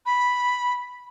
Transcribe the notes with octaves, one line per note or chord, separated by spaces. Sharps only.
B5